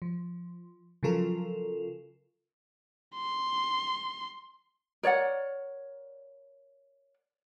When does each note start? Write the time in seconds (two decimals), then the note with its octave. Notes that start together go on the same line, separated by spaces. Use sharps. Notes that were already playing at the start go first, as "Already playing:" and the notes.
0.02 F3
1.03 C#3 F3 F#3 F4 A4 A#4
3.16 C6
5.03 A#4 C#5 D5 F#5